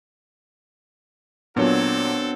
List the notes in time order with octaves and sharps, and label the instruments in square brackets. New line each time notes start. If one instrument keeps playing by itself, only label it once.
[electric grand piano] A#2 F#3 [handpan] B3 D4 C#5 [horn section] C4 F#4 A4